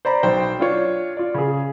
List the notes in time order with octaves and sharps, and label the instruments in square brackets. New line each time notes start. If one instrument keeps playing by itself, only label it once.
[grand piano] C5 D5 A#5 B5
B1 C5 G5
D4 F4 C#5
F4 D5
C#3 G#4